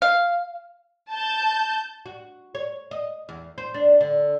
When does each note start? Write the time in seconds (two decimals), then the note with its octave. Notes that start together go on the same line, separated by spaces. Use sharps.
0.02 F5
1.12 A5 G6
2.06 F#4
2.55 C#5
2.91 D#5
3.29 E2
3.58 C5
3.74 D4
4.01 D3